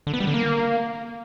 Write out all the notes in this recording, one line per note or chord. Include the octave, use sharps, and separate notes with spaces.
D3
B3
G3
D3
A#3